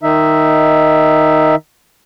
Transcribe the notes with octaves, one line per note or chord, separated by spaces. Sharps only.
D#3 D#4 E5